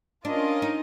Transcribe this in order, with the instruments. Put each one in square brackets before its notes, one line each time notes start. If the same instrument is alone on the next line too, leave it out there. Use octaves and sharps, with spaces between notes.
[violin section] C#4 F4 A#4 D#5 [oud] D4
[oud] D#4